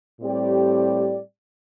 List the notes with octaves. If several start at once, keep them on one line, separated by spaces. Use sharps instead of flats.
A2 G3 C4 G4 D5